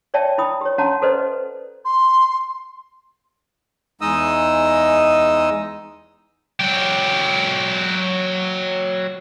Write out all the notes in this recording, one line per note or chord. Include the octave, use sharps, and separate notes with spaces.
C#5 D5 E5 G5 A5
E4 G5 B5 D#6
G4 C#5
C#4 F#4 F#5 A5 A#5
F#4 A4 B4 C5 D5 D#5
C6
E2 G#3 D#4 D#5 D#6 E6
F#3 G4